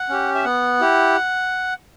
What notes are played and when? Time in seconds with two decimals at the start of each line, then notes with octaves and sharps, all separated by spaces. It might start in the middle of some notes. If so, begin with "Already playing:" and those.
Already playing: F#5
0.09 C#4 G4
0.35 E5
0.44 B3 F#5
0.80 E4 G4